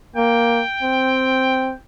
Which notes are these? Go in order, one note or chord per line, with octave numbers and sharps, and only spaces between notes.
A#3 G5
C4